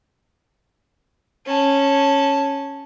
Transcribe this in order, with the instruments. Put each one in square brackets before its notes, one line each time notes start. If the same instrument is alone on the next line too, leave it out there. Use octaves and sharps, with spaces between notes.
[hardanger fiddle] C#4 A5